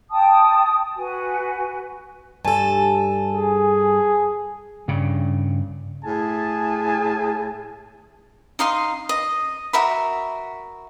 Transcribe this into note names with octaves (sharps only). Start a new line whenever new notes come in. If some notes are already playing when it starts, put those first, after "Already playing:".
G5 A5 D#6
F#4 B4 G#5
G2 A4 G#5 A5
G#4
G2 C#3
A2 G#4 G#5 A5
D#4 D#5 F5 C6
D#5
F#4 A#4 E5 B5